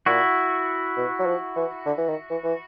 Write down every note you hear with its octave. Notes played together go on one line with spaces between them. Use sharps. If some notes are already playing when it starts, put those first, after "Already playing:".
A#2 E4 F#4
B2
F#3
F3
E3
D3
E3
D#3
E3
E3